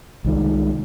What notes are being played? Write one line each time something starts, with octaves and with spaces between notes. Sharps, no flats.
C2 D#3 G#3